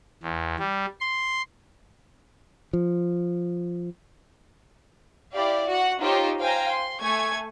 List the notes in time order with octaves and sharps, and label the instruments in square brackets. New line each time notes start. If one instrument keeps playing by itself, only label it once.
[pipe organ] E2
G3
C6
[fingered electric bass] F3
[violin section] E4 G4 D5 F5
F#4 F#5
D#4 F4 G4 C5 C#5
C5 F5 G5 G#5 A#5
C6
A3 G#5 C#6 G#6